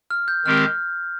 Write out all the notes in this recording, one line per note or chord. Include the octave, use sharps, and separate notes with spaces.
F6
G6
D#3 G#3 C4 G4 A#4 F6